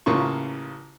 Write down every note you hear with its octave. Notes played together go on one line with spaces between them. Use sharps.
A1 C#3 A#3 F4 C#6